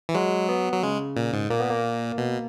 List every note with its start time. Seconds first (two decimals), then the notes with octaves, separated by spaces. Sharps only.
0.09 E3
0.14 F#3 G#3
0.49 B3
0.72 F#3
0.83 C#3 G#3
1.16 A#2
1.33 G#2
1.50 A#2 A#3
1.60 B3
1.70 A#3
2.18 B2